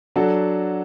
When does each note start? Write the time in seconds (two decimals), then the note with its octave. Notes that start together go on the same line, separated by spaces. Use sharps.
0.16 F#3 D4 F#4 A4